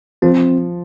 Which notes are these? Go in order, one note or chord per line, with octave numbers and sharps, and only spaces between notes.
F3 C4